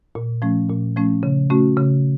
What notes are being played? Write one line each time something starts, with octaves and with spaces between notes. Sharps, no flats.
A#2
F3 A3 C#4
A#2
F3 A3 C#4
C#3
A3 C#4 F#4
C#3